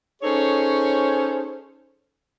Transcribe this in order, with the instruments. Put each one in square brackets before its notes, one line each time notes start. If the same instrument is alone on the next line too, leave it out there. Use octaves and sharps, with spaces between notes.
[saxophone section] C#4 D#4 G#4 A4 C5 C#5